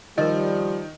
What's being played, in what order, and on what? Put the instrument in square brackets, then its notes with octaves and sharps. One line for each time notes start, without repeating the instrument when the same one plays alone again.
[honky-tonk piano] D#3 [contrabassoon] F3 [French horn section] G3 [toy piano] A#4 D#5